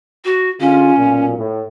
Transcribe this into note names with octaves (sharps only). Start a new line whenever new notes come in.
F#4
D3 G#3 C#4 F4
B1 A#2
A2